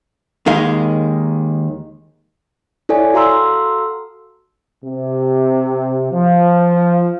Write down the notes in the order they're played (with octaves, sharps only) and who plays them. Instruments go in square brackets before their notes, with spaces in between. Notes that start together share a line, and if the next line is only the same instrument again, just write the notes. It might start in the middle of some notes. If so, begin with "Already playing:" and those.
[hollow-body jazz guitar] D#2 D#3 G#3 F5
[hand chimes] E4 A4 C#5 D5 G#5
F#4 A4 F5 A#5 C6 E6
[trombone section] C3
F3